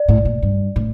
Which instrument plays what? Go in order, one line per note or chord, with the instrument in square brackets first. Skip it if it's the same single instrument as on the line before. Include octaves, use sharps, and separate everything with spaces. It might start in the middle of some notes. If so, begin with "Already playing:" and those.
Already playing: [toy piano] D5
[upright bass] A2
A#2
G2
A2